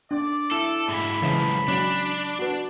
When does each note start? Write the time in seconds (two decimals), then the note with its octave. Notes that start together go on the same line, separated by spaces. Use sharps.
0.11 D4 D5
0.52 E4 A4
0.88 G#2 E3 B5
1.22 B1 C#3 E3 F3 G#3
1.68 F#3 C#4 D4
2.39 F#4 B4